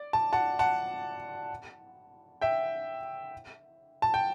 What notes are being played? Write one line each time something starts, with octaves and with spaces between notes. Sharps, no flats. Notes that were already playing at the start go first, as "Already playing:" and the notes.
Already playing: D5
A5
F#5 A5
F#5 A5
E5 G5
A5
G5